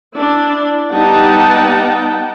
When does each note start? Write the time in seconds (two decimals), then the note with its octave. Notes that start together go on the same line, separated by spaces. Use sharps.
0.14 D4 E4
0.93 G3 B3 D#4 F#5 G5 A5